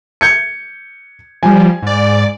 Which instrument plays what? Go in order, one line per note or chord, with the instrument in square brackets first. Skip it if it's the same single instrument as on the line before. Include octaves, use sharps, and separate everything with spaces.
[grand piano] G6 G#6 C#7
[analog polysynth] F3 G3 [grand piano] G#5
[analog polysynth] G#2 D5